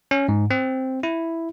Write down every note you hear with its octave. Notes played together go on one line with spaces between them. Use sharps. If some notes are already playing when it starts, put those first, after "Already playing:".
C#4
G#2
C4
E4